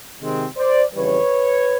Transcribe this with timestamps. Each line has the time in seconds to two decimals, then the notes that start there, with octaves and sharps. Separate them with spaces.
0.21 C3 D#3 G#3 C4
0.57 C5 D5
0.94 F2 C#3 E3 G3 B4 C#5